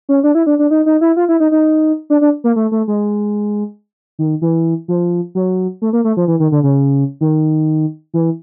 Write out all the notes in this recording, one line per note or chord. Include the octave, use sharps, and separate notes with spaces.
C#4
D4
E4
D4
D4
D#4
D#4
E4
F4
E4
D#4
D#4
D4
D4
A#3
A3
A3
G#3
D#3
E3
F3
F#3
A3
A#3
A3
F3
E3
D#3
D3
C#3
D#3
E3